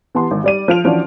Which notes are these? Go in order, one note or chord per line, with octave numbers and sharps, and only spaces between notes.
E3 B3 G4 A5 C6
G#1
G3 D5 D#7
F3 F4 F6 D7 F7
E3 F3 C#4 D4 F#4